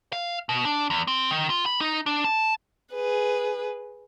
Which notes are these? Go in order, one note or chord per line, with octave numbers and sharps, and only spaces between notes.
F5
B2
D4
E2
C4
D#3
F4
B5
D#4
D4
A5
G#4 B4